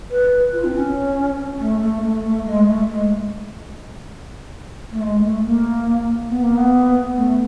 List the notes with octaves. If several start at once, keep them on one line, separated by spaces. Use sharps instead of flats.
B4
F4
C4
C#4
A3
A3
A3
A3
G#3
A3
G#3
A3
G#3
A3
A#3
B3
A#3
B3
A3